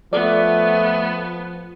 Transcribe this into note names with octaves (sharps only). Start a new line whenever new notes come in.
F3 A3 B3 D5